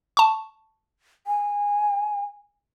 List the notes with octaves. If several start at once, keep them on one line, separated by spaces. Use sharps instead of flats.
A5 C#6
G#5